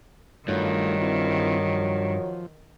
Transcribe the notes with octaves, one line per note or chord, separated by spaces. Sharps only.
G2 D#3 F#3 A3 D#4 F4
C4 E4 F4
F3